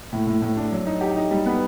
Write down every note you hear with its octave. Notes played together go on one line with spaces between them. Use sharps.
A2
A2
A2
D4
F#3
D#4
G4
D#4
G3
B3